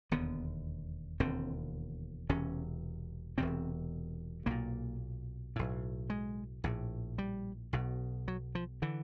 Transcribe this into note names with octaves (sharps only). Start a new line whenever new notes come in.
E1 D#2 D3 B3
E1 D#2 D3 C4
E1 E2 C3 C#4
E1 E2 C3 C4
B1 A#2 A#3
B1 A2
G#3
A#1 A2
G3
B1 B2
F#3
F3
D3 E3